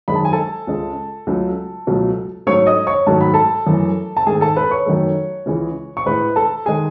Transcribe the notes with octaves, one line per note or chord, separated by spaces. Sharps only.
F#2 D#3 G#3 B5
A5
G#5
A4 A5
C#2 C#3 G#3
C#2 C#3 F#3 A3
C#2 B2 F#3 A3
G#2 F#3 A3 C#5 C#6
D#5 D#6
C#5 C#6
G#2 D#3 F#3 A3 A5
B5
A4 A5
F#2 E3 A3
A5
G#2 D#3 A3 G#4 G#5
A4 A5
B4 B5
C#5 C#6
F#2 D#3 F#3 A3
C#2 C#3 E3 G#3
C#6
A2 G#3 B4 B5
A4 A5
D#3 G#3 G#4 G#5